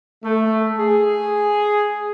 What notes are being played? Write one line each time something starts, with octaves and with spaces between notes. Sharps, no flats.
A3
G#4